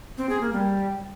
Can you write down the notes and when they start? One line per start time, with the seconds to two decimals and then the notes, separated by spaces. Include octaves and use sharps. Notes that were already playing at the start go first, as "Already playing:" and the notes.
0.18 C4
0.29 G#4
0.41 A#3
0.53 G3